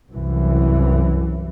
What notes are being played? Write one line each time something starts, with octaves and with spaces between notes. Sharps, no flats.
C2 F#2 E3